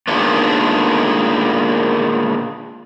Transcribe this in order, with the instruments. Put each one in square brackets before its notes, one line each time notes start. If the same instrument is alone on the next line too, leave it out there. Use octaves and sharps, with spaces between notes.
[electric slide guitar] A#2 D3 D#3 G#3 A3 B3